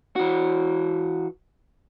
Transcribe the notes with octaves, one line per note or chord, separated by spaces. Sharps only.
E3 F#4